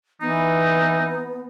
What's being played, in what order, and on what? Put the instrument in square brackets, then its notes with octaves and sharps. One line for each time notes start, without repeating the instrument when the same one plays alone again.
[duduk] E3 [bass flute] B3 [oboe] D#4